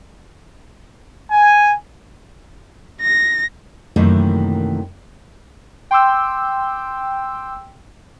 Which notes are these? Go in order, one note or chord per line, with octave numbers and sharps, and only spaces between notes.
G#5
A#6
F#2 C3 D#3 E3 A3 A#3
G5 C6 D6 E6 G6